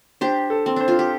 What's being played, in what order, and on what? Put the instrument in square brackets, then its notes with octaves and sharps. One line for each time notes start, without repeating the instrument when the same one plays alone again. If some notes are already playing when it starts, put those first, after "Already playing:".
[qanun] D4 G4 [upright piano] C5
[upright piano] A4
[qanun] C4
[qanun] D4 [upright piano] C5
[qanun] F4
G4